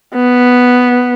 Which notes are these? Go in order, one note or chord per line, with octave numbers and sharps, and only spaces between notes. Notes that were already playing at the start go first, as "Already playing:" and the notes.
B3